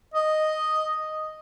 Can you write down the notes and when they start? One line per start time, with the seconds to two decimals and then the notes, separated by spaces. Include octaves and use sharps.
0.14 D#5